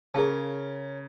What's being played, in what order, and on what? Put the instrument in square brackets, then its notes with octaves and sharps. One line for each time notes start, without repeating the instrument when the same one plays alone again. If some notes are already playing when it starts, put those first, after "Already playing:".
[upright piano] C#3 [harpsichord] C#4 A#4 [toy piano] G#4 F5 A5